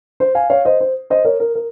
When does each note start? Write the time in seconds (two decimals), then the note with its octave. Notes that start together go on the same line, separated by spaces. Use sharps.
0.20 C5
0.35 F5 G#5
0.50 C#5 F5
0.65 C5 D#5
0.81 C5
1.10 C5 D#5
1.25 A#4 C#5
1.40 A#4
1.55 A#4